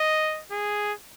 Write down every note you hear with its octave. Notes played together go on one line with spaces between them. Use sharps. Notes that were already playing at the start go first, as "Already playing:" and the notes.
Already playing: D#5
G#4